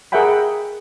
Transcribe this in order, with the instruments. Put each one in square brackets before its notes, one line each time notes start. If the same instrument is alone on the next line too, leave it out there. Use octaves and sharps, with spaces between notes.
[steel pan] G#4 A#4 E5 F#5 G5 B5